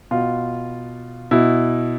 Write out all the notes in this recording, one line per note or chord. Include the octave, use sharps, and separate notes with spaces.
B2 F4
B2 E4